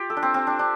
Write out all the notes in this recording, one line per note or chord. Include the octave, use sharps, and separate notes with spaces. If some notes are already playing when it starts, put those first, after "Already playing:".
Already playing: F4 G4
A4
D4
C4
C4
D4
D4